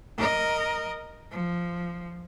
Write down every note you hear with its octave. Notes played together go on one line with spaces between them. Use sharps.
A#4 D#5
F3